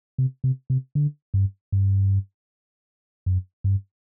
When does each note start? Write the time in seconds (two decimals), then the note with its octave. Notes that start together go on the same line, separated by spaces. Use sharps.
0.18 C3
0.44 C3
0.70 C3
0.95 D3
1.34 G2
1.72 G2
3.26 F#2
3.64 G2